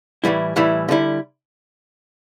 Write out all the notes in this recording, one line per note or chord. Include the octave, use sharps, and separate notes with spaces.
A2 E3 G3 E4
A2 E3 G3 E4
D3 G3 E4